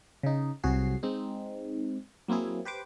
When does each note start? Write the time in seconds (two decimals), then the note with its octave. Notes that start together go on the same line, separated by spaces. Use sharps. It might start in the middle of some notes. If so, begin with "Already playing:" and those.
0.23 C#3 D#4
0.64 C2 C3 F#3 F#4 G#4 C7
1.03 G#3 C4 D#4
2.28 F#3 A#3 C4 E4 G#4
2.65 G4 B4 C5 D6